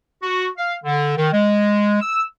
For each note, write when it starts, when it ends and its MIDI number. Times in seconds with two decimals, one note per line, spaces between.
0.23 0.46 66
0.57 0.74 77
0.84 1.14 50
1.16 1.31 51
1.32 1.97 56
2.01 2.24 88